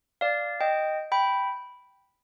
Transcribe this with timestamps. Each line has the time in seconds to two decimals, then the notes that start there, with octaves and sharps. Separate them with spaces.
0.21 D5 F5
0.61 D#5 G5
1.12 G5 B5